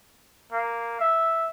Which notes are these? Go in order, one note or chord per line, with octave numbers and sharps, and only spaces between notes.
A#3
E5